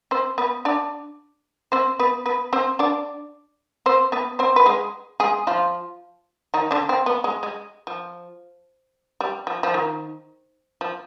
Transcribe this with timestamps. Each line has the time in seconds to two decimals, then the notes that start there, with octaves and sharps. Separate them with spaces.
0.11 C4 C5
0.38 B3 B4
0.65 D4 D5
1.72 C4 C5
1.99 B3 B4
2.26 B3 B4
2.53 C4 C5
2.79 D4 D5
3.86 C4 C5
4.12 B3 B4
4.39 C4 C5
4.56 B4
4.66 G#3 G#4
5.20 G#3 G#4
5.47 F3 F4
6.54 D#3 D#4
6.71 D3 D4
6.89 C4
7.06 B3
7.24 G#3
7.43 G#3
7.87 F3
9.21 G3
9.47 F3
9.63 F3
9.74 D#3
10.81 F3